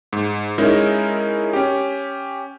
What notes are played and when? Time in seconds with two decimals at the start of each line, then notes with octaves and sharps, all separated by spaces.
0.13 G#2
0.58 G#3 C#4 D#4 E4 A#4
1.53 C#4 G4